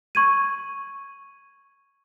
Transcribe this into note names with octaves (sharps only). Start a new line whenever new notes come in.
C#6 G#6 D#7